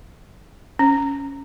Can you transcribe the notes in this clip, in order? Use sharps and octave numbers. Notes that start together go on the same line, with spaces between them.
C#4